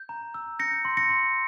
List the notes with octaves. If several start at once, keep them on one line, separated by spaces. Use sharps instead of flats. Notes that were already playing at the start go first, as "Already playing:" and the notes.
Already playing: G6
A#5
E6
G6 A#6 C#7
C6
A#6 C#7
C6